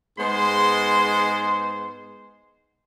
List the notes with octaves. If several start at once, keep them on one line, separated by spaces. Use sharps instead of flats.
G#2 G#3 B3 C5 C6